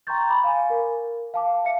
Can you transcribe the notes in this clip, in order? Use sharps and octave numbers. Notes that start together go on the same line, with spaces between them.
G5 A#5 C6 C#6 G6 A6
B5 D6
F5 G#5
A#4
F5 A5 D6
E5 F5 A5 C#7